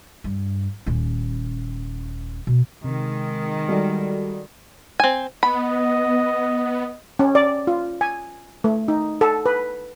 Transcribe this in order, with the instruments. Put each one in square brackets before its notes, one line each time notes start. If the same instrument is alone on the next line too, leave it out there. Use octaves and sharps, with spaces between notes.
[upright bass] G2
D#1 C#4
B2
[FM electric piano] C3 [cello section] D#3 G#3
[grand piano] G3 [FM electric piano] F#4 A4 D5
[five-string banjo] C4 G#5
[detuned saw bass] B3 [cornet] D#5 [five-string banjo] B5
[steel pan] C#4
D5
F4
G#5
A3
D#4
A4
B4